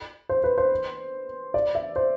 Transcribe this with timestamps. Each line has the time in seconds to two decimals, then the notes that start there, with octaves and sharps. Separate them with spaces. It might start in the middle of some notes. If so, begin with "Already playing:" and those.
0.29 C5
0.44 B4
0.58 C5
1.54 D5
1.75 E5
1.96 C5